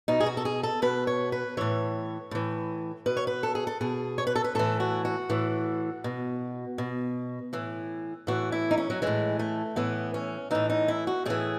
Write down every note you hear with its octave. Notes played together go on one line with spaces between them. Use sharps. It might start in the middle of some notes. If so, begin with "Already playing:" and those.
B2 D#4
G#4
F#4
A4
G#4
A4
B2 B4
C#5
B4
A2 E3 C#5
A2 E3
B2 B4
C#5
B4
A4
G#4
A4
B2 G#4
C#5
B4
A4
B4
A2 E3 A4
F#4
F#4
A2 E3
B2
B2
A2 E3
A2 E3 F#4
E4
D#4
C#4
F#3
A2 E3 G#3
A3
A2 E3 B3
C#4
A2 E3 D#4
D#4
E4
F#4
A2 E3 G#4